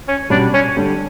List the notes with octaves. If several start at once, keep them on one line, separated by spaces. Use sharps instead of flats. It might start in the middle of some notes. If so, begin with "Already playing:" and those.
C#4
B2 G3 C#4 D4
C#4
D3 G3 D4